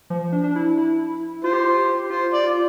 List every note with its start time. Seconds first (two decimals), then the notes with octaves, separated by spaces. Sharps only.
0.10 F3
0.32 D4
0.44 D4
0.56 E4
0.78 E4
1.44 F4 C5
1.53 G4
1.63 F4
1.78 G4
2.10 F4 C5
2.33 D5
2.44 F4